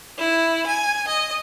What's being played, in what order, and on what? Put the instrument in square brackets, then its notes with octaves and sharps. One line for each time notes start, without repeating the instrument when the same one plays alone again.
[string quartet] E4
G#5
D#5